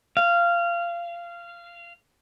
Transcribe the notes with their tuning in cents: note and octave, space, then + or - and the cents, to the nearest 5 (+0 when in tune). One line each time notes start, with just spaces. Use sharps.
F5 -20